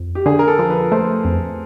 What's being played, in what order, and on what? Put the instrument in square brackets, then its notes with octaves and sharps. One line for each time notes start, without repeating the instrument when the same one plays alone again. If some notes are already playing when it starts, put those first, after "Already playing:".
Already playing: [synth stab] F2
[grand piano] G4
[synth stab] D3 [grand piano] G#4
[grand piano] A#4
A4
[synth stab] F3
[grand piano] B4
[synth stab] A3 [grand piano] C5
[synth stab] F2